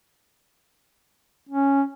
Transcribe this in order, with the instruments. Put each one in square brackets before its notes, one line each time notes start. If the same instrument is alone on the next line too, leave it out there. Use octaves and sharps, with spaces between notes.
[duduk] C#4